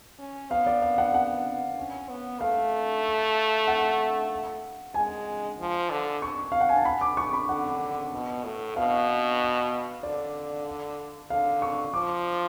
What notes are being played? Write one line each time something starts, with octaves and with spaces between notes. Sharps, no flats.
C#4
B3 F5
D5
F5
F#5
F#5
C#4
B3
A3 F5
F#5
G#3 G#5
F3
D3
C#6
F5
F#5
G#5
A5
B5
D6
C#6
B5
D3 F#5
B2
A2
B2 F5
D3 D5
D3 F5
C#6
F3 D6